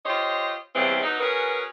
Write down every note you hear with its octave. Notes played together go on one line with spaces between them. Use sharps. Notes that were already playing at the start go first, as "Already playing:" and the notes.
F4 G4 C5 C#5 D#5
E2 C#3 E3 G3 C4
F#3 B3 D#4
C#4 F#4 G#4 A#4 B4